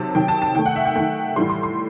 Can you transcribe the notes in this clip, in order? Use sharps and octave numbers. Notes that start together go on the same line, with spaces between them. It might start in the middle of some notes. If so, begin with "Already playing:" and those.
Already playing: C3 D#3 F#3 A5
C3 D#3 F#3 G5
A5
A5
D#3 A3 G5
F#5
E5
G5
D#3 A3 G5
A2 E3 G3 C6
C6
C6